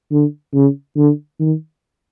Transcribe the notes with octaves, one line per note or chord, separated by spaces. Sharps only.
D3
C#3
D3
D#3